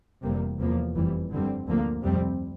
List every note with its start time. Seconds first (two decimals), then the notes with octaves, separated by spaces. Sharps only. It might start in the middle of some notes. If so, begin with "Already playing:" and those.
0.23 F1 E2 C3 G3 A#3
0.59 E2 C3 F3 A#3
0.95 F1 F2 E3 G3
1.31 G2 D3 G3 C4
1.67 D2 D3 F3 A#3
2.02 F2 C3 G3 C4